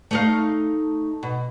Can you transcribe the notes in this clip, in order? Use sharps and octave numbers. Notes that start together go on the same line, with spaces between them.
A3 D#4 F5
B2